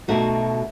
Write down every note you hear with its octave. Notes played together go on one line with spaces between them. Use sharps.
B2 A3 D#4 F#4